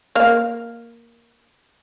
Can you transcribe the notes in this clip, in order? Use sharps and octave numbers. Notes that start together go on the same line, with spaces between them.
A#3 F5